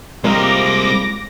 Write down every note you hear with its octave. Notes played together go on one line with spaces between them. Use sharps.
G3 G#3 A#3 C4 F4 D6 A#6